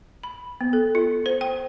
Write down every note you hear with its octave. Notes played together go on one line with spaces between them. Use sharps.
B5
B3
A4
F4
C5
G5